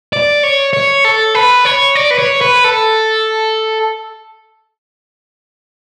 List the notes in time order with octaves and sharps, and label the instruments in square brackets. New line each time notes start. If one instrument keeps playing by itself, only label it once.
[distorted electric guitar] D5
C#5
C#5
A4
B4
C#5
D5
B4
C#5
B4
A4